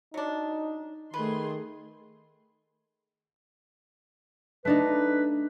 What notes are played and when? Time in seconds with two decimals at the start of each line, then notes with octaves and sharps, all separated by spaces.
0.14 F#3 D4 D#4
1.14 D#3 A3 G#4 B4 C6
4.65 A3 D4 D#4 B4